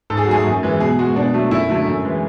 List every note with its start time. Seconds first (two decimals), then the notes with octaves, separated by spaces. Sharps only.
0.10 G#2 A4
0.17 G#4
0.25 F#4
0.28 F#3 A3 G#4
0.46 F#2
0.63 E3 G#3
0.80 B2 G#4
0.99 G#3 F#4
1.16 B2 D4
1.34 F#3 A3
1.51 F#2 E4
1.69 D3 F#3 A3
1.87 F#2
2.05 E3 G#3